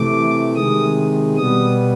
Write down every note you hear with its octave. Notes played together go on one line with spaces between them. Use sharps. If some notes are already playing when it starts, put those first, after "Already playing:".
Already playing: C3 E3 A3 D6
C3 D#3 G#3 D#6
B2 G3 B3 D#6